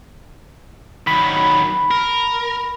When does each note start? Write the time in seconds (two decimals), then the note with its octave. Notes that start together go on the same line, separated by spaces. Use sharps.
1.07 D#3 F#3 B5
1.91 A#4